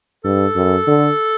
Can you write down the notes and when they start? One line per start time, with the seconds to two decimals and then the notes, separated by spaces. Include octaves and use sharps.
0.24 G2 A4
0.56 F#2
0.87 D3